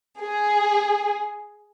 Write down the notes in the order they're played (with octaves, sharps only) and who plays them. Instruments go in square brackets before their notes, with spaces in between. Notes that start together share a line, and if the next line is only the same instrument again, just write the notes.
[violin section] G#4